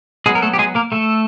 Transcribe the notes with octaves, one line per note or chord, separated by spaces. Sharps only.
F#3 G#3 B3 G#4
A#4
A3 A4
G4
G#3 G#4
A#3 A#4
A3 A4